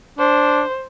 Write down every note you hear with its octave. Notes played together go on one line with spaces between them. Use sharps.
D4 C5